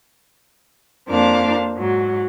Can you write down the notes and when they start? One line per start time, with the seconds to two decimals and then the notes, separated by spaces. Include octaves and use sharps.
1.08 F2 A#3 D4 C5 F5 D6
1.76 G#2 F#3